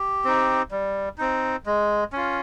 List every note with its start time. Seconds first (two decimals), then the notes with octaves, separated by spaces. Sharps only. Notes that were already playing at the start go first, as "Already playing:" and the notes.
Already playing: G4
0.25 C4 D#4
0.71 G3
1.18 C4 D#4
1.66 G#3
2.13 C#4 F4